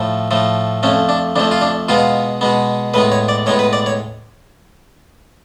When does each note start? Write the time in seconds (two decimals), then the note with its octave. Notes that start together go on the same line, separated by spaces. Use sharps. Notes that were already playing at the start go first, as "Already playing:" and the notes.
Already playing: A2 F3 A3
0.31 A2 F3 A3
0.83 F2 F3 A3 C#4
1.09 D4
1.36 F2 F3 A3 D4
1.51 F4
1.62 D4
1.89 B2 G#3 B3 F4
2.41 B2 G#3 B3
2.94 A2 G#3 B3 B4
3.12 C#5
3.28 D5
3.46 A2 G#3 B3 C#5
3.59 B4
3.73 D5
3.86 C#5